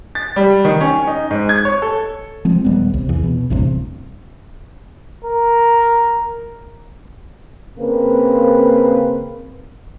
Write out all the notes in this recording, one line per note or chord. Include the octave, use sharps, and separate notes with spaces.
A6
G3
D#3
C#4
D#4
G#2
G#6
C#5
A4
F3 G#3 C4
D#1 G3 B3
C2
E2
B2
A1 E2 G2 C3
A#4
C#3 A#3 C4 A#4 B4